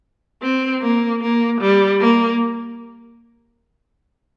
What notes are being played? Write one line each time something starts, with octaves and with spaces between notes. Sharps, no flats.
C4
A#3
A#3
G3
A#3